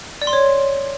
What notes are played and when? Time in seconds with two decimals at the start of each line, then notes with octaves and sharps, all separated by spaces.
0.22 D5
0.27 C6
0.33 C#5